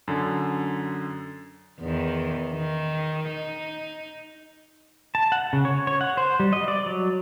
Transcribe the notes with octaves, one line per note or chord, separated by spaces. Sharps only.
F#2 D3
E2 D#3
D#3
D#4
A5
F#5
C#3
C#5
C#5
F#5
C5
G3
D#5
D5
F#3